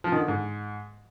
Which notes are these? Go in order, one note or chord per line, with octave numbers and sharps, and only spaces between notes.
F3
D#3
D3
G#2